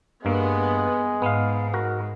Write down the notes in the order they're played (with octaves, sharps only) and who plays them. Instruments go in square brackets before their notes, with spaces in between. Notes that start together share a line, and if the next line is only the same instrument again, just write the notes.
[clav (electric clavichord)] G2 A#3 [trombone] G#3 [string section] B3
[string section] G#2 [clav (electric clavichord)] B3 F5
[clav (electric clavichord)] F#4 A#4